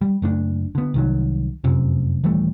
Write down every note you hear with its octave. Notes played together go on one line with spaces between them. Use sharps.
G3
F#1 A3 D4
D3 B3
C2 D#3 F#3
F1 F#2 C3
D#1 E3 G3 A3